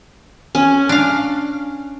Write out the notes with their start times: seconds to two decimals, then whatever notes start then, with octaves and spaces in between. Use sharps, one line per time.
0.55 C#4
0.89 D4 F5